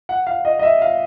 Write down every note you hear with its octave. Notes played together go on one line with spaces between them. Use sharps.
F#5
F5
D#5
D#5
E5
F5